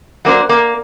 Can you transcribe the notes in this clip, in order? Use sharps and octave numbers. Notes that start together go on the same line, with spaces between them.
F#3 A#3 D4 C5
A#3